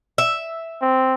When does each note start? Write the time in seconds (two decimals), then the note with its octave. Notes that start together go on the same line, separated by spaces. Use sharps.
0.18 E5
0.81 C4